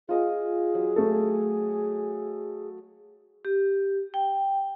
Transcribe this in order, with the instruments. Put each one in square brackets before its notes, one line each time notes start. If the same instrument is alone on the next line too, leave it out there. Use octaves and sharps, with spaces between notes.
[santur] F4 D#5 C#6 [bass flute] G#4
[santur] F#3
[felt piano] A3 A4
[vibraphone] G4
G5